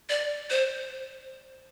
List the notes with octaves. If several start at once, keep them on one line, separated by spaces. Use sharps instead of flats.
D5
C5